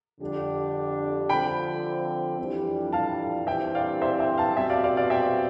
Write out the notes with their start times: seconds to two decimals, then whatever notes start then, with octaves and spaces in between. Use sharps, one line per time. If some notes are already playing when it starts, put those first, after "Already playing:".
0.20 F2 D3 G3 D4 G4
1.29 D3 F3 C4 G5 B5
2.38 F2 E3 G3 D4
2.93 F5 A5
3.47 G2 E3 G3 C4 E5 G5
3.75 D5 F5
4.01 C5 E5
4.20 E5 G5
4.38 F5 A5
4.57 B2 G3 C4 E5 G5
4.70 D5 F5
4.84 D5 F5
4.97 D5 F5
5.10 E5 G5